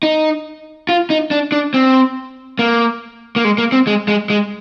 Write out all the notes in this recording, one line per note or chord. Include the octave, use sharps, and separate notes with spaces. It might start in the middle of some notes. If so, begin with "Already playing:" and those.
D#4
F4
D#4
D4
D4
C4
A#3
A#3
G#3
A#3
C4
G#3
G#3
G#3